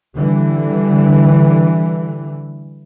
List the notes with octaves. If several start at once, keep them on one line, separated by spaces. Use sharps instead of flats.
D3 E3 G3